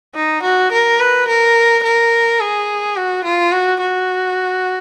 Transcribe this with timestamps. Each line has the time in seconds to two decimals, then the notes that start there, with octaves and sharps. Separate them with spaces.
0.15 D#4
0.43 F#4
0.72 A#4
1.00 B4
1.28 A#4
1.84 A#4
2.41 G#4
2.96 F#4
3.24 F4
3.52 F#4
3.81 F#4